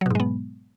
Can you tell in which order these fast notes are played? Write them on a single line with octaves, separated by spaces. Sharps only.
F#3 B2 G#2 G#3 B3